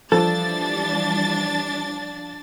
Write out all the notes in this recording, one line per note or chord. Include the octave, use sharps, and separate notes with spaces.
E3 F3 G3 D4 A4 A6